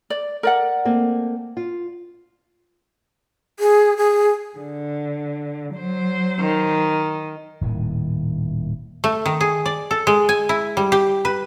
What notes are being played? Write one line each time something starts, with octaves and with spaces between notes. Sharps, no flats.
D5
A#4 D5 F#5
A3 A#3 C4
F4
G#4
G#4
D3
F#3 C5
D#3
D#1 A2 D#3
A3
D#3
G#4
D5
A4
G#3
G#5
E4
G3
G4
B4